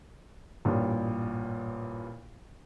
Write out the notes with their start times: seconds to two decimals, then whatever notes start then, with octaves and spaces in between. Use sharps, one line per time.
0.65 A1 G2 A#2 D4